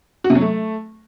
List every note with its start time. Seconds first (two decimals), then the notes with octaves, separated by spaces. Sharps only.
0.24 F#4
0.30 C3
0.35 F#3
0.41 A3